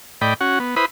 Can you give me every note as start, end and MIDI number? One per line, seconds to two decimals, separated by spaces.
0.21 0.34 45
0.21 0.34 74
0.21 0.34 75
0.21 0.34 79
0.21 0.34 83
0.41 0.59 61
0.41 0.59 66
0.41 0.59 78
0.60 0.75 59
0.76 0.85 64
0.76 0.85 71
0.76 0.85 72
0.76 0.85 83
0.76 0.85 87